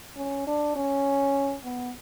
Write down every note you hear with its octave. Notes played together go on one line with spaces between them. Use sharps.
C#4
D4
C#4
B3